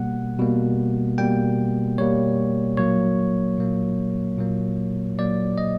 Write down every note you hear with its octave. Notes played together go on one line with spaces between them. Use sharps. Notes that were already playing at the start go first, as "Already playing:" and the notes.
Already playing: B2 G3 A#3 F#5
B2 G3 A#3
B2 G3 A#3 G5
B2 G3 A#3 C#5
A#2 F#3 A#3 C#5
A#2 F#3 A#3
A#2 F#3 A#3
A#2 F#3 A#3 D5
D#5